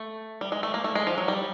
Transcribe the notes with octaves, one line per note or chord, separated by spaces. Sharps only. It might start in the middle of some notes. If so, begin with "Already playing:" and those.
Already playing: A3
G3
G#3
A3
A#3
A3
G#3
F3
F#3
G3